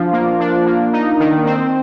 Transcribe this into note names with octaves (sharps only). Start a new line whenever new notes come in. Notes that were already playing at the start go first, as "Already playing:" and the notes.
Already playing: F3 D4 F4
A#3
D4
A#3
D#4
D#3
C4